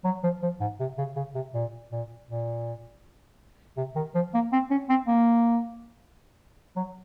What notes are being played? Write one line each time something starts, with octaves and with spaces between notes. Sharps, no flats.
F#3
F3
F3
G#2
C3
C#3
C#3
C3
A#2
A#2
A#2
C3
D#3
F3
A#3
C4
C#4
C4
A#3
F#3